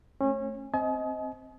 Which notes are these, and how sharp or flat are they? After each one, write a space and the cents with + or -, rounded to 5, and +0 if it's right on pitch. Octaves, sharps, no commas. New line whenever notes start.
A3 +0 C#4 -30
C4 +0 D#5 +20 G#5 +45